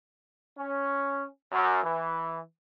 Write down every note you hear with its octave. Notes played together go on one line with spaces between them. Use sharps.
C#4
F#2
E3